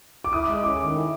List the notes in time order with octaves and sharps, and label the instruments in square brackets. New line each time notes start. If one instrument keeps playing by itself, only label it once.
[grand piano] D6
[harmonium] E4 [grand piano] D#6
[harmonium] G#3
[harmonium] C#4 [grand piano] D6
[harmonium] D#3
E4